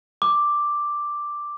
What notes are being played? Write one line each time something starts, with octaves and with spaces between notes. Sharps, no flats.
D6